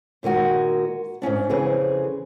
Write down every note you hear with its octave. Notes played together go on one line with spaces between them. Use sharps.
A#2 D#3 G#3 F#4
G#2 A#3 C#4 D4
F2 C#3 E3 C4 G#4